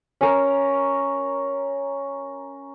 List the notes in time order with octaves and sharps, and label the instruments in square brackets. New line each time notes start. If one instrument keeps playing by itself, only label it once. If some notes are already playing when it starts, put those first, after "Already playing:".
[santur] C#4 A#4